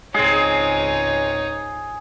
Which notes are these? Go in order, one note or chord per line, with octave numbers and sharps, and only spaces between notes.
C#2 G#2 G#3 C4 D#4 G#4 C#5